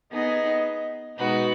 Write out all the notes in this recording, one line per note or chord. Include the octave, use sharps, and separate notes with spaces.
B3 D#4 G#4 D#5
B2 G#3 D#4 F#4 B4